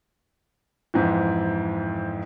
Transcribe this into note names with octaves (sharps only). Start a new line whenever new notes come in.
F2 G#2 E3